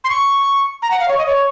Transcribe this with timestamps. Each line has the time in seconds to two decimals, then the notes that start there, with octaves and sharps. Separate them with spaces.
0.04 C6
0.10 C#6
0.82 A#5
0.91 F#5
1.00 F5
1.08 C#5
1.18 D#5
1.26 C#5